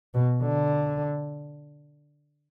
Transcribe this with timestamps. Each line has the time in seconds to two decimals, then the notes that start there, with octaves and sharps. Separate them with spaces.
0.14 B2
0.42 D3